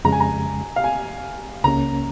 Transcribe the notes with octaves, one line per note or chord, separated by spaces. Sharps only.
F2 C#3 G#3 A#5
G#5
A#5
F5
G#5
C#2 C#3 A#3 C#4 A#5